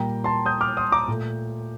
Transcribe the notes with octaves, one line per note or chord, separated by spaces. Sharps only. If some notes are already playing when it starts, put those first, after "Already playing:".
Already playing: A#2 G3 A#3 G5 A#5
A5 C6
D#6 G6
D6 F6
C6 D#6
A#5 D6
A#2 A3